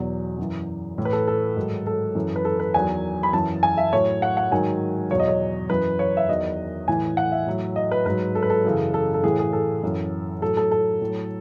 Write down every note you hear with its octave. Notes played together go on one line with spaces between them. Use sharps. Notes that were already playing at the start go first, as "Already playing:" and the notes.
Already playing: E2 B2 F#3
F#2 E3
A2 E3
B4
A4
A4
G#2 D#3 F#3
A4
F#2 E3
B4
A4
B4
E2 D#3 F#3 G#5
B5
F#2 E3 A5
G#5
E5
A2 F#3 C#5
F#5
F#5
G#2 D#3 F#3 G#5
E2 B2 F#3 C#5
D#5
C#5
F#2 E3 B4
C#5
E5
E2 D#3 F#3 D#5
A2 E3 G#5
F#5
E5
A2 F#3
D#5
B4
G#2 F#3 B4
A4
B4
A4
F#2 C#3 E3
A4
A4
A2 E3 G#4
G#4
A4
F#2 E3
A2 F#3 A4
A4
A4
A2 F#3